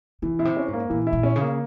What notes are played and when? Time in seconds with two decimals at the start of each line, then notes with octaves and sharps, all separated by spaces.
0.22 C3 E3
0.39 A#2 E4
0.45 C3
0.56 C#4
0.68 G#2
0.73 A#3
0.90 A#2 E3
1.07 E4
1.13 A#2
1.23 C#4
1.36 C#3
1.41 A#3